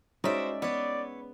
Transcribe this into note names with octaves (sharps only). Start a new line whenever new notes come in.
G#3 C#4 D#4 F#4 C5 D5 E5
B3 B4 C#5 D5